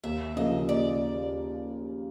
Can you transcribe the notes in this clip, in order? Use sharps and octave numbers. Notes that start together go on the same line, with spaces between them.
D#2 E5
C#3 F3 A#3 D#5
D#2 D5